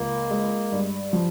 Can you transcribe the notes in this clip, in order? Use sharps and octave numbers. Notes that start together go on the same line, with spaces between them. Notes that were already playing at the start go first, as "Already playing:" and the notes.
Already playing: C#2 A#3
G#3
G2
F3